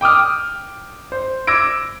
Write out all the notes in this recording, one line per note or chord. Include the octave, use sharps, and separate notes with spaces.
G5 D6 D#6 F6
C5
D6 E6 G#6 A#6 D7